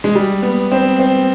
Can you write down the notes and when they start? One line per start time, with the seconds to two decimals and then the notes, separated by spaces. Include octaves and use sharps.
0.04 G#3
0.15 G3
0.42 B3
0.72 C4
0.99 C4